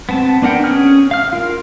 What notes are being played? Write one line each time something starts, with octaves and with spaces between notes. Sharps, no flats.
B3 C4 A5
B3 D4 A#4 F#5 G5
C#4 G#4 F6
F5 F6
F4 A#4